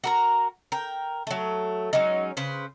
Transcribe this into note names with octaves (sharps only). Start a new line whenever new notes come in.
F#4 A#4 A#5
A#4 G5
F#3 A3
F#3 G#3 C#4 D#4
C#3 B4 C5